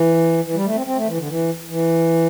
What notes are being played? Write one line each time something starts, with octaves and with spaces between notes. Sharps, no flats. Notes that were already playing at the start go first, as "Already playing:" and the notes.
Already playing: E3
E3
G3
A3
C4
C4
A3
E3
D3
E3
E3